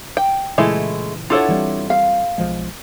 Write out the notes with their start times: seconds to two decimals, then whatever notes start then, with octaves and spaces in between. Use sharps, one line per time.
0.17 G5
0.58 A#2 C#3 E3 G#3 A3 E4
1.30 D4 E4 F4 A4 C#5 F#5
1.49 E3 G3 C4
1.90 F5
2.38 B1 F3 G#3